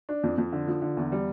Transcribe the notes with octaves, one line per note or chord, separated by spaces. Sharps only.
D4
F2
F2
D3
F3
D3
E2
G3